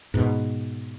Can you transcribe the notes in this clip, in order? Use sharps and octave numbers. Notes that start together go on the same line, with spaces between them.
G#2 B2